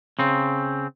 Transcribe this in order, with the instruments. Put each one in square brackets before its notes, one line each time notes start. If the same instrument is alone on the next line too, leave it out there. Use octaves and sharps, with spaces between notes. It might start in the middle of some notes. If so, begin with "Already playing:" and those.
[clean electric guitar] C#3 C4